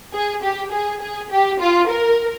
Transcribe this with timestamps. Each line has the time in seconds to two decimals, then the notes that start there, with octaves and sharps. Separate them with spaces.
0.13 G#4
0.43 G4
0.72 G#4
1.01 G#4
1.30 G4
1.60 F4
1.88 A#4